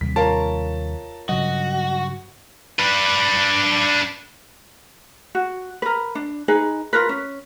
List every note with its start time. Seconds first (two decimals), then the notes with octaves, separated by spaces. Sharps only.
0.01 D#2 C3 G3 B6
0.16 F4 A#4 C#5 A5 A#5
1.29 G2 C#3 F#3 F#4 D#5
2.79 D4 B4
5.35 F#4
5.82 A#4 B4
6.15 D4
6.48 D#4 G#4 B4 G#5
6.93 F4 A#4 B4
7.09 C#4